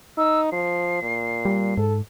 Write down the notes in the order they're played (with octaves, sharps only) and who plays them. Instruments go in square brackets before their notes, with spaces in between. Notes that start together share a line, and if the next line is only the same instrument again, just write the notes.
[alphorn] D#4 [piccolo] E6
[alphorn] F3 [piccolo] C7
[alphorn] A#2
[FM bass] G3
[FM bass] G#2 [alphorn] A4